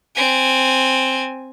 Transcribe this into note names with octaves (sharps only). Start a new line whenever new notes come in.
C4 G#5